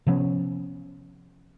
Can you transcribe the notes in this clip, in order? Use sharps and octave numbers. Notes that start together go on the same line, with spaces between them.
C3 F3 B3 C#4